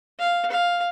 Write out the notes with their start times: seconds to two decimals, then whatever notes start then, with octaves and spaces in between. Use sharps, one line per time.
0.19 F5
0.51 F5